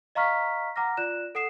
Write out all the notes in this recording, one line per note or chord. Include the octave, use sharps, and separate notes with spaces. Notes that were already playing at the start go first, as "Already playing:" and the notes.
D#5 F5 A#5 C#6 F6 B6
F#5 A#5 D6 F6 A#6
F4 D5 F#6 E7
A4 F#5 D#6 C7 E7